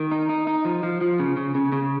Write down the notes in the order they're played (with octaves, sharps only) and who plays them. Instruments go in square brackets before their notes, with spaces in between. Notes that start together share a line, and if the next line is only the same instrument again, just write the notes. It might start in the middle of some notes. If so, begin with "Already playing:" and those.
Already playing: [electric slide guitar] D#3
D#4
D#4
D#4
F3
F3
F3
C#3
C#3
C#3
C#3